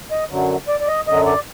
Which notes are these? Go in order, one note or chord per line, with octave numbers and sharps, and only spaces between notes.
D#5
F#2 D3 F#3
D5
D5
D#5
F#2 D3 F#3 D#5
D5